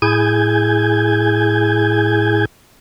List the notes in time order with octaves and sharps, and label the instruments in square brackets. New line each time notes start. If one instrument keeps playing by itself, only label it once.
[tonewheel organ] A2 E4 G#4 G#5 G6 G#6